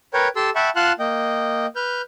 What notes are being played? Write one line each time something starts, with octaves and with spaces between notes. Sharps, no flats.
A#4 B4 C#5 G5
G4 A4 A5 C6 E6
E5 F#5 G5 A5 B5 C#6
F4 F5 F#5 A5 C6 F#6
A#3 D#5 G5
B4 F6 G6